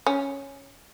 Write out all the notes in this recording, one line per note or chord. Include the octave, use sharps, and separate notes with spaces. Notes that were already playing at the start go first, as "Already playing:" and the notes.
C#4